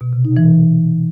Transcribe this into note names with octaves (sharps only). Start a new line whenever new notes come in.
B2
C3
D#4
E3